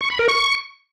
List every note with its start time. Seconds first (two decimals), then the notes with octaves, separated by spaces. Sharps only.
0.01 C#6
0.10 B5
0.19 A#4
0.28 C#6